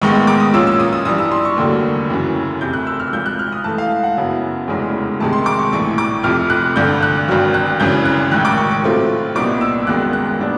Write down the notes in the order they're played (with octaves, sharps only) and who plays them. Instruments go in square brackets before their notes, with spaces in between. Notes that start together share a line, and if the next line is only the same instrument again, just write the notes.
[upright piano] A1 G#2 D#3 G#3 B3 C#6
C#6
D6
D#6
A#2 F3 A#3 C#4 F4 E6
E6
D#6
D#6
G2 E3 G3 D#6
E6
C6
C#6
F1 D#2 D3 F#3 A#3
F#2 C#3 E3
F1 F2 C3 G6
F#6
E6
F6
G#1 G#2 F3 G6
F#6
F6
D#6
G#2 E3 A3 A5
F5
F#5
F#2 C#3 F#3 B3 E4
F1 E2 C#3 E3 G#3
D2 C3 D#3 G#3 A5
C6
D6
C#6
A#1 A2 E3 C#6
D6
F1 F2 C3 F3 F6
F#6
G#1 G2 D3 G6
F#6
G#1 G2 D#3 F#3
F#6
G#1 F#2 C#3 E3 G6
F#6
A1 G#2 D#3 F#6
D6
C#6
C#6
A2 F#3 A3 C4 F4
C2 A#2 G3 B3 D#4 D6
E6
G#1 F#2 D#3 G#3 B3 F#6
F#6
A#2 G3 B3 D4